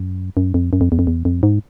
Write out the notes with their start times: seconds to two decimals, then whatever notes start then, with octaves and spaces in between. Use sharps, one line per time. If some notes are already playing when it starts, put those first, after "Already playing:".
Already playing: F#2
0.37 F#2
0.54 F2
0.73 F#2
0.81 F2
0.92 E2
0.99 F2
1.07 E2
1.25 F2
1.43 G#2